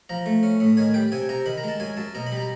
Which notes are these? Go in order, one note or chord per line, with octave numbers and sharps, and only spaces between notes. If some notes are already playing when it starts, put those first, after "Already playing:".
F3 A#5
A3
C#4
A2
D#3 G#5
G3 G5
C3 G#5
C3 A#5
D#3 B5
A#5
G#3 A5
F#2 G#5
F#2 A5
B2 A#5
B5
G3 A#5